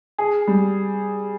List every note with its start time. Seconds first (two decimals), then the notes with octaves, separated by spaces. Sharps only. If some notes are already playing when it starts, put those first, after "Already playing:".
0.18 G#4
0.47 G3